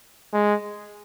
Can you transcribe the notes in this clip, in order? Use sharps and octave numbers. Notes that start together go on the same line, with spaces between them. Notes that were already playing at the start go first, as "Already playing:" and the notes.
G#3